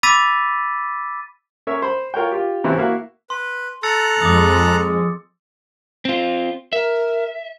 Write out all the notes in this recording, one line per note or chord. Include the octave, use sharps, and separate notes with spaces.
B5 D6 E6 A6 B6 D#7
C#4 A#4 C#5 E5
C5 B5
F4 A#4 C#5 G5
F4 G4
G#1 C3 E3 C#4 G4 C5
A#3 E4 F#4 F5
B4 C6
A4 A#5 E6 F#6 A6 C#7
F2 G#3 D6 D#6
C4 F4
A#4 E5